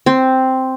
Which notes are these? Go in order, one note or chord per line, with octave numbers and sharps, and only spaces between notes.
C4